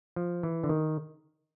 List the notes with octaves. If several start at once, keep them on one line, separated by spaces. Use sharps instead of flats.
F3
E3
D3
D#3